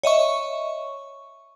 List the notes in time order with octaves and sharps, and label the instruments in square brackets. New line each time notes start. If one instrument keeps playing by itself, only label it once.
[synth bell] C#5 D#5 E5 C#6